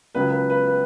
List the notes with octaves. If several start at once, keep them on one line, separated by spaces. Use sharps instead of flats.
C#2 C#3 F#3 B4
B4
B4
B4